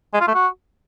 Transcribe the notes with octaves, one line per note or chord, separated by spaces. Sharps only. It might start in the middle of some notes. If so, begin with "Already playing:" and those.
G#3
F4
A3
F#4